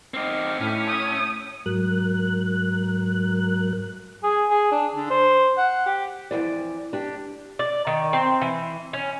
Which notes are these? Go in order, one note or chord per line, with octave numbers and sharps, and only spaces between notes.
C4 D#4 G5 D6 F6
A2 C#4 B6 D#7
D#6 E6 G6
G#2 F#3 A#4 F#6
G#4
G#4
D4
D3
C5
F#5
G4
F2 C#3 E3 D5
D4 G4
D5
D#3
C4
E3
C#4